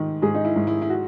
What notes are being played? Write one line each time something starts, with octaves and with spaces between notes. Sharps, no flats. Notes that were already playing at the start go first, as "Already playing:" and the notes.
Already playing: G#2 D#3
G#2 G#4
D#4
E4
G#2
E4
E4
F#4